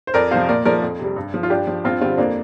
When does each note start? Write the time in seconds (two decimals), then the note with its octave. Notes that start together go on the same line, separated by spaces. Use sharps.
0.07 C5
0.14 F2 A#4 D5
0.31 C3 F3 C5 F5
0.48 A#2 A#4 D5
0.65 F3 A#4 D5
0.82 F2
0.99 C3 G3
1.16 G2
1.34 F3
1.43 F4
1.50 G2 D4 G4
1.67 F3
1.84 G2 C4 F4
2.01 D3 G3 C4 F4
2.18 F2 A#3 D4